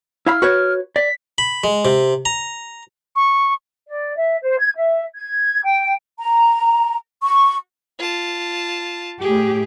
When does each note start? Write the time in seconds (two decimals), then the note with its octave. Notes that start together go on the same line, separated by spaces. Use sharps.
0.26 E4 F5 B5 F6
0.42 F#4 B4 C#5
0.96 D5 B6
1.38 B5
1.64 G#3
1.85 C3
2.25 A#5
3.16 C#6
3.87 D5
4.16 E5
4.42 C5
4.58 G#6
4.76 E5
5.15 G#6
5.63 G5
6.20 A#5
7.22 C#6
7.99 F4 A5
9.21 A2 G4 G#4